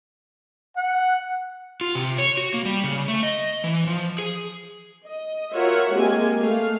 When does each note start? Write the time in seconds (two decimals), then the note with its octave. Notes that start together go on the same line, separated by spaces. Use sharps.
0.76 F#5
1.81 F4
1.95 C3
2.18 C#5
2.37 F#4
2.54 A#3
2.66 G3
2.84 C#3
3.08 A3
3.23 D#5
3.64 E3
3.87 F3
4.19 G#4
5.06 D#5
5.53 F4 F#4 A#4 C#5 E5 F#5
5.93 G#3 A#3 C4 G4 G#5
6.41 A3 F5